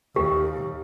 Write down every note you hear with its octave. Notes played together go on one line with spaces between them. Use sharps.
D#2 G4